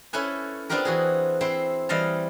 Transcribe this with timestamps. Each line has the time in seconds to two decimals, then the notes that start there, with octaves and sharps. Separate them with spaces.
0.13 C#4 E4 A4 B4 G#5
0.70 B3 C4 D4 F4 G4 A#4
0.85 E3 F#4 G#4
1.41 C4 E4 C5
1.89 E3 G3 D#5 F5 A5